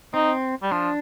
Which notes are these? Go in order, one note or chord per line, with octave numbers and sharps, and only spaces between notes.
C4 D#4
G3
F3 D4